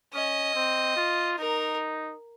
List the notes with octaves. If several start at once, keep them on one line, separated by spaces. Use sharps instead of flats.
C#4 D#5
C4
F4
D#4 A#4